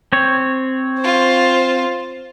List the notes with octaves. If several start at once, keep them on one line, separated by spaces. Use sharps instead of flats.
C4 C#5
F4 C5